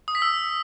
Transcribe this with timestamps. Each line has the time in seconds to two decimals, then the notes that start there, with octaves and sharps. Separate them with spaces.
0.08 D#6
0.15 B6
0.22 E6